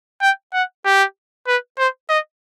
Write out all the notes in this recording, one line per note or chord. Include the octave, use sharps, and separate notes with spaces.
G5
F#5
G4
B4
C5
D#5